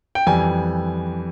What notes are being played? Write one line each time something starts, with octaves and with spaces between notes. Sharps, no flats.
G5
F2 E3 G3 G#5